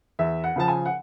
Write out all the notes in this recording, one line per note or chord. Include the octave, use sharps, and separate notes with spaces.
E2 E5
F#5
C#3 F3 A5
G#5
F#5